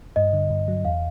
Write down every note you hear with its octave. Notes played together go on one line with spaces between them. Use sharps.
G2 D#5
D3
G2
F#3
E2 F5